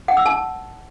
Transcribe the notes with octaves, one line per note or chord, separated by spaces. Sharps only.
F#5
E6
A5